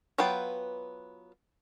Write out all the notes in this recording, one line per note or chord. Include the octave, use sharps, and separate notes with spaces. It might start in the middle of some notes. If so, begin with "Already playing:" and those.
F#3 B3 F4 B4 G5